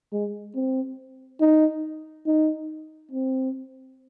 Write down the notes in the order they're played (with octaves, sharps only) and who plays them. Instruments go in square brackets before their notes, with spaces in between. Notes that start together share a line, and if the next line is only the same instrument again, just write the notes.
[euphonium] G#3
C4
D#4
D#4
C4